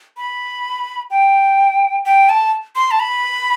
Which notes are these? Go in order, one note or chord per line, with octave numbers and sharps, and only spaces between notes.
B5
G5
G5
A5
C6
A5
B5